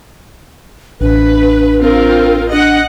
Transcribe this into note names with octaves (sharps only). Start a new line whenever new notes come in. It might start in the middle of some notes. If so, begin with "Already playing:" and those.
A1 D4 B4
C4 F4 A#4
D4 D#5 F#5